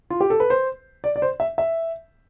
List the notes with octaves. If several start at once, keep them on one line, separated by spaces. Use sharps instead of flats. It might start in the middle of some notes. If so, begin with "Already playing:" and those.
F4
G4
A4
B4
C5
D5
D5
C5
E5
E5